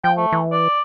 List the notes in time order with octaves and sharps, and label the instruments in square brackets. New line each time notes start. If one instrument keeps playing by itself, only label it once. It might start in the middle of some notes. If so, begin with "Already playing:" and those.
[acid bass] F3 [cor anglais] G5
[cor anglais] A3
[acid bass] E3
[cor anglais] D5